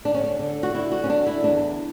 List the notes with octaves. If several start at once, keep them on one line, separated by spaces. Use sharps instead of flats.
D3 D4
C#4
D4
D3
F#4
D3 E4
F#4
C#4
D3 D4
E4
E2 D4